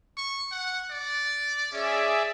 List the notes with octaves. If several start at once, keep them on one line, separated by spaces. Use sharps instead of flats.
C#6
F#5
D5
C#4 G#4 D5 E5